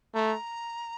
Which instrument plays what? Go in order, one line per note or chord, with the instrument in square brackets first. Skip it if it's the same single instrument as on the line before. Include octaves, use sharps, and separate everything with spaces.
[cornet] A3 [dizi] A#5